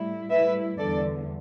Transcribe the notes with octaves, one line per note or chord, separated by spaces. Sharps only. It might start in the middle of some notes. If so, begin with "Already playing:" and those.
Already playing: A2 G3 E4
A2 G3 E4 B4 E5
E2 D3 G3 A4 D5